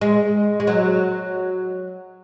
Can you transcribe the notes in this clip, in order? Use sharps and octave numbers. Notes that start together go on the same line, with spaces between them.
G#3
G#3
F#3